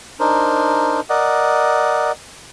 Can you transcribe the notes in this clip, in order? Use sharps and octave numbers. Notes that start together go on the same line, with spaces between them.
D4 D#4 A#4 C5
A#4 D5 D#5 F#5